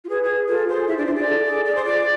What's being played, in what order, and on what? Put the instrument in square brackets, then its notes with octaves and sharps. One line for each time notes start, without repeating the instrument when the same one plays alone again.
[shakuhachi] F4
[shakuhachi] G#4 [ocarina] B4
[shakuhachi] G#4
[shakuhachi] F4 [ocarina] A4
[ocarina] G#4 [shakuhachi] C5
[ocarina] E4 [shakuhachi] E5
[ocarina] D4 [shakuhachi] D5
[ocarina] F4 [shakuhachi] C5
[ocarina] G#4 [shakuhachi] D5
[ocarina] A4
G#4
[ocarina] G#4 [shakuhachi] D5
[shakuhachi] C5
[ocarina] F4 [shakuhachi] D5